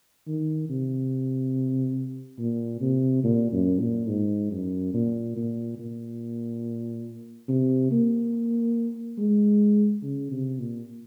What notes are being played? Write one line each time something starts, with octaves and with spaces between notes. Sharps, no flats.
D#3
C3
A#2
C3
A#2
F#2
A#2
G#2
F#2
A#2
A#2
A#2
C3
A#3
G#3
C#3
C3
A#2